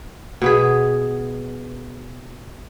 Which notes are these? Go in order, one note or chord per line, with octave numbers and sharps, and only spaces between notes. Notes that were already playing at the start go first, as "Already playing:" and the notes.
B2 B3 G#4